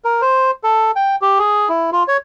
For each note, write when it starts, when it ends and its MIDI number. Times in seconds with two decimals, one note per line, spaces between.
0.04 0.21 70
0.22 0.51 72
0.63 0.91 69
0.96 1.16 79
1.22 1.39 67
1.39 1.69 68
1.69 1.90 64
1.92 2.03 65
2.08 2.17 73